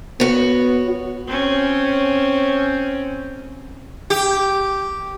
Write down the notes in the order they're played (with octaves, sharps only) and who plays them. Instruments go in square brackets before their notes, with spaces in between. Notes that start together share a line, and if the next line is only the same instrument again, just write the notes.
[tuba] B3 [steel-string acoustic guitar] F#4 C#5
[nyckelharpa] C4 C#4
[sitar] G4